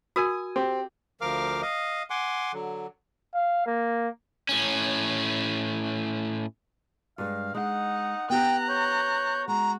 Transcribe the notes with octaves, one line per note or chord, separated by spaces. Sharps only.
F#4 A#4 G#5 D#6
C4 G4
D2 F3 A#4 F5 D6 F6
D#5 F5
F#5 G#5 C6 D6
D3 F#3
F5
A#3
A2 C#4
G2 G#3 F5
G#3 D#4 F#5
B3 G4 G5 A#5 F#6
C#5 G6
G#3 F#4 A#5